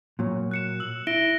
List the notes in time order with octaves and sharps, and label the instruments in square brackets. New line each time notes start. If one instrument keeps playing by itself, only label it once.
[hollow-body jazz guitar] A#2 F#3
[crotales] F#6 C#7 E7
E6 F#7
[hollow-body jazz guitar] E4 [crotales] A#6 D7 G7